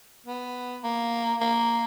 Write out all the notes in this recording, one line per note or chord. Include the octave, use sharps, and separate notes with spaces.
B3
A#3
A#3